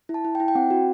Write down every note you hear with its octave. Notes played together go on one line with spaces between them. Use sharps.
E4
A5
E4
G5
E4
G5
C4 F#5
F#4